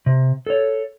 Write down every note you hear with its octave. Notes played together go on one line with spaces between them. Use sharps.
C3
A4 C#5